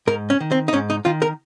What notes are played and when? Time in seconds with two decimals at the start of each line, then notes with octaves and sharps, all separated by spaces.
0.07 G#2 A#4
0.30 C#4
0.40 D#3
0.52 C4
0.68 D#4
0.73 G#2 C#4
0.90 D#4
1.05 D#3 F4
1.22 A#4